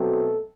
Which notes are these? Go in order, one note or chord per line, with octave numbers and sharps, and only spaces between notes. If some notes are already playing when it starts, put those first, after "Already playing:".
Already playing: B2 F#3 A3 C4 A4